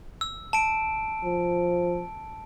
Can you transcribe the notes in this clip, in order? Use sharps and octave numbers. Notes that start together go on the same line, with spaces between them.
E6
A5 D7
F3